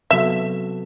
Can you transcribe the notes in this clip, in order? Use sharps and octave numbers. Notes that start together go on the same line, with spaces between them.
C3 F#3 B3 F#4 A4 E5